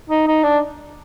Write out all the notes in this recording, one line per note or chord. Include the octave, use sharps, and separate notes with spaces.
D#4
D#4
D4